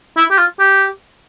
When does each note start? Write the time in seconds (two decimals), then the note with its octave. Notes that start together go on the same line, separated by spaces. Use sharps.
0.17 E4
0.31 G4
0.38 F4
0.60 G4